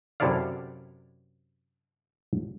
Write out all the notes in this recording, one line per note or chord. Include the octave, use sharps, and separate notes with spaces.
F#2 C3 E4 A4 D5 F5